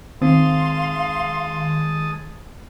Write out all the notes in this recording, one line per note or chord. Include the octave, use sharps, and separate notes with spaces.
D#3 G#3 C4 F5 A5 C6 D#6